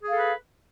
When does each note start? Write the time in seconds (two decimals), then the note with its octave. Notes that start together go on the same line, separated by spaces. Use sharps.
0.03 G#4
0.08 F5
0.12 A4
0.16 B4